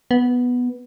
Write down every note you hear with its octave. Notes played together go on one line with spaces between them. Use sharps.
B3